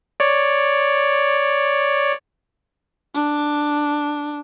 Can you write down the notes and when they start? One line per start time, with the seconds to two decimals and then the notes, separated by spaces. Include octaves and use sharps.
0.20 C#5 D5
3.14 D4